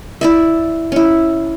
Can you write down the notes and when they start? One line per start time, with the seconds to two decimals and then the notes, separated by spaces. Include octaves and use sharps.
0.21 E4 D5 E5
0.92 C#4 E4